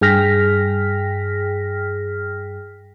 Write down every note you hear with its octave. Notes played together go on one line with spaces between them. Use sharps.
G2 G#4 G5 F6 A#6 B6